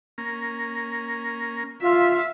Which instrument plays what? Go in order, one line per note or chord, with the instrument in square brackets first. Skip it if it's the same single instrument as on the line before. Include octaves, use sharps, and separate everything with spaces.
[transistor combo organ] A#3 C#4 A#4
[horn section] F4 [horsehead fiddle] E5 F5